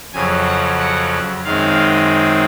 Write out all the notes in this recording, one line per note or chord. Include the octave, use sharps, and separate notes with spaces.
F2 C#3 F#3 G#5
F#5
F#5
F#2 D#3 G#3 C4 F5